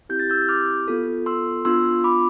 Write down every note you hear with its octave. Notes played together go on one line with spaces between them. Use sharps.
C4 E4 G4 G6
A6
E6 G6
G6
D6 F6
B3 F4 A4
C6 E6
B3 D4 F4 C6 E6
B5 D6